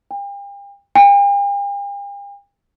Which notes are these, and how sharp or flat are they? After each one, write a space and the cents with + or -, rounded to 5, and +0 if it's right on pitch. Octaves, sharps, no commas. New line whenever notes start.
G5 +40
G5 +45